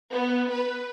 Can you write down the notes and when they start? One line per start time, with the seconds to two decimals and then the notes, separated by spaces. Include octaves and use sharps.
0.12 B3
0.51 B4